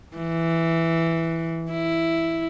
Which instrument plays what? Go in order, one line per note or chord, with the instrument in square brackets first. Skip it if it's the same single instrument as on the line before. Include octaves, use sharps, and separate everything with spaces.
[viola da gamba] E3
E4